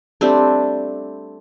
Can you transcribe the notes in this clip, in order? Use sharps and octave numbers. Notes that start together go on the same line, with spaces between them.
G3 A3 C4 D4